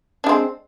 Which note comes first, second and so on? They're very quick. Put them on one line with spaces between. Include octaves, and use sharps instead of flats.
D4 G#3 C4